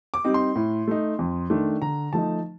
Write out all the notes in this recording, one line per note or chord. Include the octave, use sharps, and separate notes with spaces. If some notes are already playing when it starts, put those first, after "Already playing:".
D6
G3 C4 D#4
C6
A2
A3 D#4
F2
D#3 A3 D4
D3 A#5
F3 A3 D#4 A5